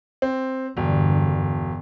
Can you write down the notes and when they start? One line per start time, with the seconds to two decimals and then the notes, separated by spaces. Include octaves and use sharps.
0.22 C4
0.77 E1 G2 D3